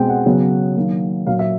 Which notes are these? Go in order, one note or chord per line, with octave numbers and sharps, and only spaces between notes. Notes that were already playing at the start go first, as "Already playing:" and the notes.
Already playing: B2 G#3 C4 G5
F#5
C#3 F#3 B3
D#3 F#3 A#3
A#2 F#3 A#3 F5
E5